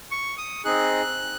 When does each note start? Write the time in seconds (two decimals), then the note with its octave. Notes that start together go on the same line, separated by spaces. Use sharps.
0.11 C#6
0.38 D#6
0.65 C4 D#4 G#4 F#6